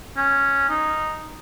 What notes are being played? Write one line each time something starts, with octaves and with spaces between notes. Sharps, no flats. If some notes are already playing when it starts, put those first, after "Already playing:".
C#4
D#4